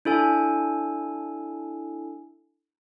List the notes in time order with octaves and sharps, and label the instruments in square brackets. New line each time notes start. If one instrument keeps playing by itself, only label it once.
[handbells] D4 E4 A4 G#5